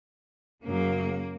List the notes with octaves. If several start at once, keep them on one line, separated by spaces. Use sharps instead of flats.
F#2 C#3 F#3 A#3